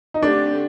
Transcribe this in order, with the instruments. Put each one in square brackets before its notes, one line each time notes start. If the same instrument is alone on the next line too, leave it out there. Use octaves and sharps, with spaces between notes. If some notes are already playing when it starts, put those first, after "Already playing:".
[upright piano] D#4
[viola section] D3 A3 C4 G4 [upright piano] D4